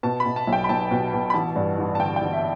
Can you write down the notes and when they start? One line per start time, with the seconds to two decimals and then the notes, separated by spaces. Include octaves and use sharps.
0.03 B2 A5
0.20 B5
0.26 B2
0.36 A5
0.47 B1
0.53 G5
0.64 B5
0.69 B1 A5
0.91 B2
1.13 B2
1.30 B5
1.34 A1 A5
1.56 G2
1.79 A1
1.95 A5
1.99 D3 G5
2.16 G5
2.22 A1
2.33 E5